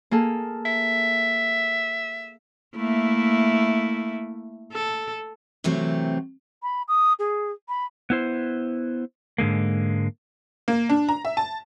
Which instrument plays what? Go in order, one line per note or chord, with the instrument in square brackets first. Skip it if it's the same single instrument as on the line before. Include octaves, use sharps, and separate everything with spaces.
[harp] A#3 G#4 A4
[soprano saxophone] E5
[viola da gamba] A3 A#3 E4
A4
[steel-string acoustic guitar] C3 E3 F#3 A3 C4
[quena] B5
D#6
G#4
B5
[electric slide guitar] B3 E4 C5
G#2 D3 G#3 A#3
[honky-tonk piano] A#3
D4
A#5
E5
A5